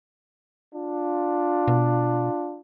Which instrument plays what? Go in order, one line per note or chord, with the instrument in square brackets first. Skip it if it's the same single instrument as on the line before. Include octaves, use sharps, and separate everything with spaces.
[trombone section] D4 F4
[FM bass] B2